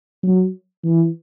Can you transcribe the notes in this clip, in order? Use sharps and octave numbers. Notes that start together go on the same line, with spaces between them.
F#3
E3